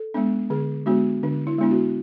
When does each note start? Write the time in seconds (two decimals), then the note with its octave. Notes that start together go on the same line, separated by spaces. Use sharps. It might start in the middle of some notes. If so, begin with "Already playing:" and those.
Already playing: A4
0.14 G#3 B3 D4
0.50 D3 G#4
0.86 G#3 B3 D4 F#4
1.23 D3 D4
1.47 E4
1.58 G#3 B3 D4 E4
1.71 F#4